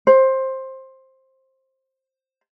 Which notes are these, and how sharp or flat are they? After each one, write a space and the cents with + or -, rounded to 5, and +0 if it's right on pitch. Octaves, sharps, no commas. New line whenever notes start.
C5 +15